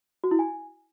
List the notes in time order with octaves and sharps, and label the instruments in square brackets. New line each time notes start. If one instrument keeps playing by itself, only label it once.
[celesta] F#4
E4
G#5